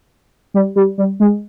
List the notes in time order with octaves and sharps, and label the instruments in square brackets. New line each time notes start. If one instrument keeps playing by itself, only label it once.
[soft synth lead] G3
G3
G3
G#3